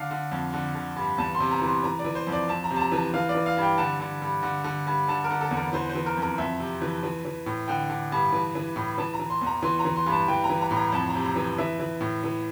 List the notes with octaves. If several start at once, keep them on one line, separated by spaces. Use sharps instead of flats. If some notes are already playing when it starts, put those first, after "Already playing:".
Already playing: D3 F5
D3
F2
D3
D3
G2
E2 A5
C6
C3
A#5
E3
C6
E3 A#5
D5
E3
C5
F2
D5
F2 A5
A#5
C3
A5
A#5
E3 A5
E3 F5
D5
E3
F5
G2 G5
D3 A5
D3
G2
D3
D3
G2
D3 A5
A#4
D3
A4
E2
A#4
E3 C5
C5
E3
A#4
F2 A#4
F2 E5
C3
E3
E3
E3
A2
D3 G5
D3
G2
E3
E3
A2
E3 A5
A#5
E3
C6
E2
A#5
E3 C6
A#5
E3
C6
G2
A5
E3 G5
A#5
E3
A#5
A2
A#5
F2 A5
A#5
C3
A#5
E3
E3 E5
E3
A2
E3